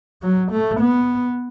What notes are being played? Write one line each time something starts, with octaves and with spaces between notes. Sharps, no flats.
F#3
A3
B3